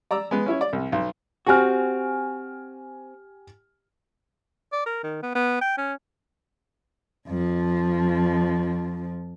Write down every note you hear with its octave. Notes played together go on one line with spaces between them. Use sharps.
D5 A#5 D6 E6
G#3 B3
C#4 E4 C#5
D5
C2
B1
C4 F#4 G4 G#5 F6
D5
A#4
D#3
B3
B3
G5
C#4
F2 F3